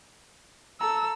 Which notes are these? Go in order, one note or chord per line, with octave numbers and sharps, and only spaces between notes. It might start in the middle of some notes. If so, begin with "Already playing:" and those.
A4 A#5 E6